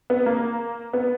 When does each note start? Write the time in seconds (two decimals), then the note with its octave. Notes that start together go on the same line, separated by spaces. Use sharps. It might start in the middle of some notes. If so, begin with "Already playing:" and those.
0.10 B3
0.26 A#3
0.93 B3